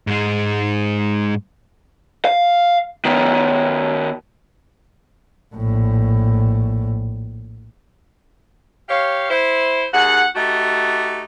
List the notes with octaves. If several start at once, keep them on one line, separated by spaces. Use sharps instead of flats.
G#2 G#3
F5
D#3 B3
A#1 A2
G4 C#5 F5
E4 C5
D#2 G#4 F#5
A3 D#4 F#4 G4